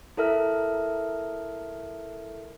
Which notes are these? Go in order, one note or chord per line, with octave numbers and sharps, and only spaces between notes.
E4 A4 A#4 E5 F6